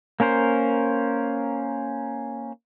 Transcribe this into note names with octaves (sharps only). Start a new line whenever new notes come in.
A#3 C#4 A#4 C5